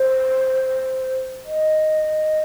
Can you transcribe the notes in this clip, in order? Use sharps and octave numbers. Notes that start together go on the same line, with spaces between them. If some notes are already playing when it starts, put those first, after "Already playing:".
Already playing: C5
D#5